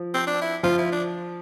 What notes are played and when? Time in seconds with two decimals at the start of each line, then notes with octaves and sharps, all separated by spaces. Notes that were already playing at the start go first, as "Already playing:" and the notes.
Already playing: F3
0.14 C4
0.27 D4
0.41 E4
0.63 F3 F4
0.78 E4
0.92 D4